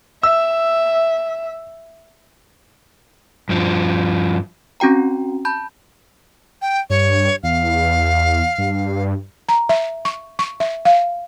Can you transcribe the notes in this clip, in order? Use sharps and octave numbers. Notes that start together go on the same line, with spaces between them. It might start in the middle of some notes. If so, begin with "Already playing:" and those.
E5 E6
G2 F3
C4 C#4 F#4 G5 A#5
A5 B5 G6
G5
G2 C#5
E2 F5
G2
A#5
E5
C#6
C#6
E5
F5